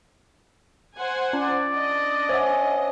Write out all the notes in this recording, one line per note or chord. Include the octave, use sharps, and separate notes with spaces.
C5 F#5 G#5
C#4 D5
D4 D#5
C#4 C5 E5 F#5